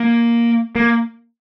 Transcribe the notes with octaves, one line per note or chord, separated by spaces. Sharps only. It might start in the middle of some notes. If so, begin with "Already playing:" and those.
Already playing: A#3
A#3